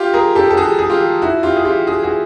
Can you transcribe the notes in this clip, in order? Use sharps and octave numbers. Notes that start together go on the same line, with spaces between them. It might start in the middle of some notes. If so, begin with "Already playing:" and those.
Already playing: F4 G4
G#4 A#4
G4 A4
A4
F#4 G#4
G#4
F4 G4
E4 F#4
F4 G4
G#4
F4 G4
F#4 G#4
F#4 G#4